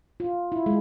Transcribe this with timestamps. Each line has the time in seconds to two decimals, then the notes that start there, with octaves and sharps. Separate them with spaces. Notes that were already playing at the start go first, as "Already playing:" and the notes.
0.20 F4
0.52 E4
0.66 G#3